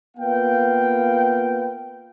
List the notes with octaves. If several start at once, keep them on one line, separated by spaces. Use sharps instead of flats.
A#3 B3 F4 F5 G5